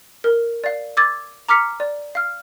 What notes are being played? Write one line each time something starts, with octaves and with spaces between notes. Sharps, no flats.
A#4
D5 F5
D6 E6 G#6 A6
A#5 D6 F6 B6 C#7
D5
F5 F6